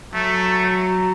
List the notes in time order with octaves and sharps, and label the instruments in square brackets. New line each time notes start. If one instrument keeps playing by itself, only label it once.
[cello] F#3 [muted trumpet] A3